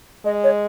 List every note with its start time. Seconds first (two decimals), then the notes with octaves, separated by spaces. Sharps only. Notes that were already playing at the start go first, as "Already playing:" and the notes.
0.25 G#3 D#5
0.44 C#5